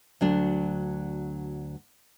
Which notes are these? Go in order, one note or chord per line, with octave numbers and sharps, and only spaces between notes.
D2 F#3 D4